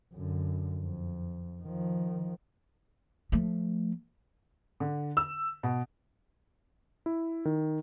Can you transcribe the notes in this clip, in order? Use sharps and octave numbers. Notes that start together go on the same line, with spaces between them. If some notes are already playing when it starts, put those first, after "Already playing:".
F#2 D3
F2
D#3 F3
F3 A3
D3
E6
B2
E4
D#3